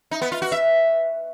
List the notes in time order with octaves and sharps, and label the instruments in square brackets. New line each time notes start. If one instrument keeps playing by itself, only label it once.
[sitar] D#4
B3
F4
F#4
E5